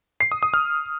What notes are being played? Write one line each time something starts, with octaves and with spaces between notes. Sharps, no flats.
C7
D#6
D#6
F6